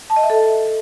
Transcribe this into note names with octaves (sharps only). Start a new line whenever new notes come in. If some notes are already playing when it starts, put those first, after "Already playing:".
A5
D#5
E5
A4